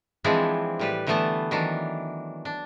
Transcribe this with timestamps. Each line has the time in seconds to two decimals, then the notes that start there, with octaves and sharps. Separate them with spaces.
0.24 E3 F3 G#3 C4 D4 E4
0.79 A2 G3 B4
1.07 D3 E3 G3 A3 B3 A5
1.51 D#3 E3 F#3 D4
2.45 D4